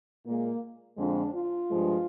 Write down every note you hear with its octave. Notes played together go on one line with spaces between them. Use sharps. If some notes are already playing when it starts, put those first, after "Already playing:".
A#2 G#3 A#3
F2 D3 F3 G#3 D4
F4
G2 F3 G#3